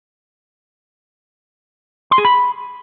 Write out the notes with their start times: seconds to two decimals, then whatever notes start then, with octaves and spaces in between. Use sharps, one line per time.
2.11 C6
2.18 G#4
2.25 B5